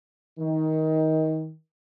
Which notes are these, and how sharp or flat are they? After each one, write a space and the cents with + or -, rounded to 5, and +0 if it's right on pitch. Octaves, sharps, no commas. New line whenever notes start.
D#3 +20